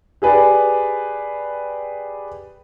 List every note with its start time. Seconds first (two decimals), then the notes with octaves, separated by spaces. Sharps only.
0.22 G4 G#4 B4 D5